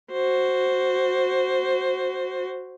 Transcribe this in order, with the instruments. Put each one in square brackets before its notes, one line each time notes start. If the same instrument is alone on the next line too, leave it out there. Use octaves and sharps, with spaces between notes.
[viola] F#4 C5